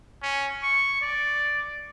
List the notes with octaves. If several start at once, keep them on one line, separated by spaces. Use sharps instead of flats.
C#4
C#6
D5